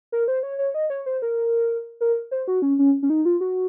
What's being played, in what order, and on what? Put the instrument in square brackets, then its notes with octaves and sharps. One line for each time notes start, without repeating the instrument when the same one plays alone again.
[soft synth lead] A#4
C5
C#5
C#5
D#5
C#5
C5
A#4
A#4
C5
F#4
C#4
C#4
C#4
D#4
F4
F#4